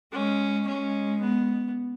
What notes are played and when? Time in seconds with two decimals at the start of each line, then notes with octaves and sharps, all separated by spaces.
0.13 G#3 C#4
0.67 G#3 C#4
1.21 B3